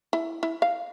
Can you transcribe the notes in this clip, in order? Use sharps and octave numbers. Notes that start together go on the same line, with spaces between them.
E4
E4
F5